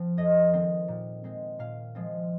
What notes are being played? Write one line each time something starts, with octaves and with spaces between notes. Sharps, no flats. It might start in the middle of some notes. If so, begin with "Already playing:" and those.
Already playing: F3 C4
F2 D#5
D#3 G#3 C4
A#2
G#3 C4
A#2 F5
F3 G#3 C4